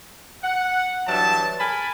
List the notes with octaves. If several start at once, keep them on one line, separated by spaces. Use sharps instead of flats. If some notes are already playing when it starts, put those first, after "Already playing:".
F#5
G2 E3 F#3 E5 A5
A#4 G#5 A5 B5